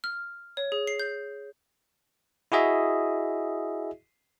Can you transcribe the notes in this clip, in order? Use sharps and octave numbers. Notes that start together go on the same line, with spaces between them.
F6
C#5
G#4
C7
G6
E4 F#4 G#4 D#5 E5